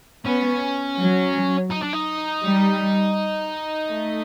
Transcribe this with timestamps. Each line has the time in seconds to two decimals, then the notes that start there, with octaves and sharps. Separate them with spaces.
0.25 B3 C#4
0.98 F#3
1.70 D#4
1.82 D4
1.93 D#4
2.43 G3
3.88 A3